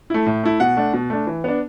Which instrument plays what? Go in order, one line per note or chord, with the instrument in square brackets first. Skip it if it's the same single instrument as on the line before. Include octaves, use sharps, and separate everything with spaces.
[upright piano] A3 E4
A2
A3 E4
B2 F#5
A3 D4
B2
A3 D4
E3
B3 D4